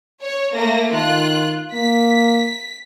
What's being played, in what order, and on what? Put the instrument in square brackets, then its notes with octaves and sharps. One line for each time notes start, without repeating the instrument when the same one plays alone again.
[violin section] C#5
A3 A#3 A#6
[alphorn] D#3 [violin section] F4 F#6
[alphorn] A#3 [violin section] B6